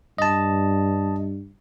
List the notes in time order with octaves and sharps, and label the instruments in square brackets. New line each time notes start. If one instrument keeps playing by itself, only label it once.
[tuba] G2 [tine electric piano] D#5 A5